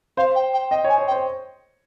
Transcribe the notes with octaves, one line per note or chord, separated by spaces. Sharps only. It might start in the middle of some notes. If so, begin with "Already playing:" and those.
C5 F5
G5
G5
D#5 G5
C#5 G#5
C#5
G5
C5